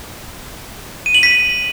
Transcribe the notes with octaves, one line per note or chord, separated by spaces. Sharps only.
D#7
F#7
B6